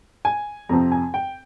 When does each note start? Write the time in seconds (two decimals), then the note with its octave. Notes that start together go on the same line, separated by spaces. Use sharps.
0.25 G#5
0.69 F2 C3 F3 C4 A#5
0.92 G#5
1.14 G5